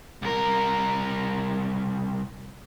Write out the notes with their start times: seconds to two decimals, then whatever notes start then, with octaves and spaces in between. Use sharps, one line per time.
0.22 C2 A#4